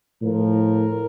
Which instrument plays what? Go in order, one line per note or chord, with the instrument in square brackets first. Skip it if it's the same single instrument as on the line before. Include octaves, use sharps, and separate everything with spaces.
[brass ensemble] A2 F3 A#4